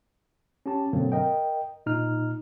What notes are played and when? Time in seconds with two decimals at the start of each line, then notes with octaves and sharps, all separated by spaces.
0.66 C#4 G4 A5
0.93 G2 B2 D3 F#3 A#3 C4
1.12 A#4 D#5 G5
1.86 A#2 D#4 F6